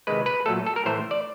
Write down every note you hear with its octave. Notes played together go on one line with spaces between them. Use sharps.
C3 D#3 G#3 B4
B4
A#2 F#3 A3 A4
A4
A#4
A2 E3 A3 C5
D5